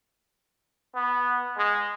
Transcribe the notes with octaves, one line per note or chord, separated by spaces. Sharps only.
B3
G#3